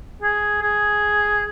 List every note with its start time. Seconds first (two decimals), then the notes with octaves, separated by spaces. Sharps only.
0.22 G#4
0.62 G#4